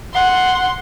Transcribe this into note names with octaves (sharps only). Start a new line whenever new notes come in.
F#5 C6